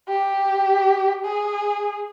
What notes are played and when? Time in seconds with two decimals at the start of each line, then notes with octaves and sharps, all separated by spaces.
0.09 G4
1.25 G#4